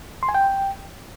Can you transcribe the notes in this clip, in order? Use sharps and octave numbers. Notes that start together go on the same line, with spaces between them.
C6
G#5
G5